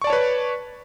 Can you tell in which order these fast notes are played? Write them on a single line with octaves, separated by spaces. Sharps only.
C#6 D5 A5 C#5 B4